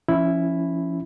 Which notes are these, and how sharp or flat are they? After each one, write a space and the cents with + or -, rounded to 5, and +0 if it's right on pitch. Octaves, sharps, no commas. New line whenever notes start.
F3 -35 C#4 +0 E4 +0